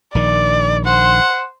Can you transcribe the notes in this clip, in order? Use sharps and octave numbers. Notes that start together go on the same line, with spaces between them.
A#1 D#3 D5
C5 F#5